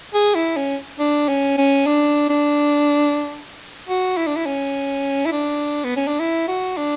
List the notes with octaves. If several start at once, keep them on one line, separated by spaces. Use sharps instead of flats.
G#4
E4
C#4
D4
C#4
C#4
D4
D4
F#4
E4
D4
E4
C#4
E4
D4
B3
C#4
D4
E4
F#4
D4